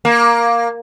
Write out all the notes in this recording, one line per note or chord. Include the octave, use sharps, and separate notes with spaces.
A#3